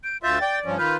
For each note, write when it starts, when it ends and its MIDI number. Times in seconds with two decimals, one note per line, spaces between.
0.04 0.17 91
0.04 0.18 98
0.23 0.39 38
0.23 0.39 65
0.23 0.39 76
0.23 0.40 91
0.23 0.60 93
0.41 0.77 74
0.41 0.59 79
0.66 0.78 43
0.66 0.78 53
0.66 0.78 61
0.78 0.97 51
0.78 0.97 65
0.78 0.97 71
0.78 0.96 89
0.78 0.93 91